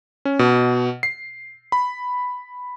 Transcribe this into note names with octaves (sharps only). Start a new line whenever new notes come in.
C#4
B2
C7
B5